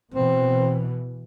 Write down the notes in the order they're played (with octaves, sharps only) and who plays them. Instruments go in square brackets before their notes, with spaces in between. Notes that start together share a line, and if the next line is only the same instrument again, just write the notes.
[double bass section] B2 E3 [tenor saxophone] C4